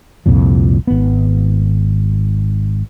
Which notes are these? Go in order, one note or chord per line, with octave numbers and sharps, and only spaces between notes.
C2 F2 A#2 F3
G#1 B3